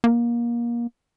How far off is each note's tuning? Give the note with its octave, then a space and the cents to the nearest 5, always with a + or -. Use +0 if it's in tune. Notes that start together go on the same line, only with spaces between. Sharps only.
A#3 +25